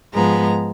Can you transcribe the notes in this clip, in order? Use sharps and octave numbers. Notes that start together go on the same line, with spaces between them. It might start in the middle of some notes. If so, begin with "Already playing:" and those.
G#2 F3 G#3 B3 A#5